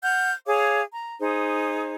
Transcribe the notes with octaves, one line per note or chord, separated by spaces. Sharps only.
F#5 F6 G6
G#4 C#5 F5 D6
A#5
D#4 G#4 C5